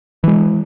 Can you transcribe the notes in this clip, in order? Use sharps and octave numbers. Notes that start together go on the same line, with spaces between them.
E3 G#3